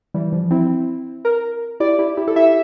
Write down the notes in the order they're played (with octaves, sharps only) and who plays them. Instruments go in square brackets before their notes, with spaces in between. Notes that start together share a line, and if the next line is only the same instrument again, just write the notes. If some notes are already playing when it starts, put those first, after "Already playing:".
[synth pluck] E3 G3
F3
C4 E4
[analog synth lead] A#4
[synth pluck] E4 G4 [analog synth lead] D5
[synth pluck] E4 G4
E4 G4
A4
[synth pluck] E4 G4 [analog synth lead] E5